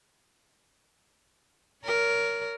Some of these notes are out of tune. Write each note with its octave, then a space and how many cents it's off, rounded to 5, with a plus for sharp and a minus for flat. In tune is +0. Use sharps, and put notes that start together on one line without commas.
A#4 +0 C#5 +35